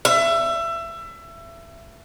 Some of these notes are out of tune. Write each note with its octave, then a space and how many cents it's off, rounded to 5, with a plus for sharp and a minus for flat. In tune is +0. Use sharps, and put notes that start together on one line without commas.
E5 +25